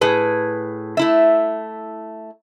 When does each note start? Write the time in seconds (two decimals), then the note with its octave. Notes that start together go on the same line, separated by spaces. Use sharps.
0.01 A2 G#4 B4
0.97 A3 E4 E5